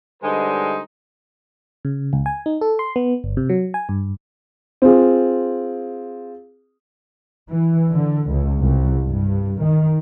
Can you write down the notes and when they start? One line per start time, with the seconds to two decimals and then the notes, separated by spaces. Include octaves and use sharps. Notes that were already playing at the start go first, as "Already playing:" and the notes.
0.23 D3 G3 G#3 D#4 B4 C5
1.85 C#3
2.13 C#2
2.26 G#5
2.46 D#4
2.61 A4
2.79 C6
2.96 B3
3.24 G1
3.37 C3
3.49 F#3
3.74 G#5
3.89 G2
4.82 C4 F4 G#4
7.51 E3
7.93 D3
8.31 C#2
8.63 C2
9.08 G2
9.63 D#3